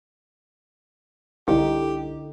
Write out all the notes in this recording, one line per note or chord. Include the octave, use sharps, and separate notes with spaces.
C2 D3 D#4 E4 G4